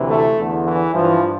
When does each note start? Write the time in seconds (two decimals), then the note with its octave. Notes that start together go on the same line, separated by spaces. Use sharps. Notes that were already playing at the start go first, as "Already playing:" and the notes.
Already playing: D2 C3 E3
0.09 A3
0.37 E2 D3
0.64 E3
0.93 G2 E3 F3